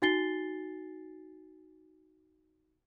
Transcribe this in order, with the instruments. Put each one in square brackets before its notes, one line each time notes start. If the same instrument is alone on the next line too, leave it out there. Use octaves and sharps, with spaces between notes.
[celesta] D#4 F#4 G#5 A6 C7 G7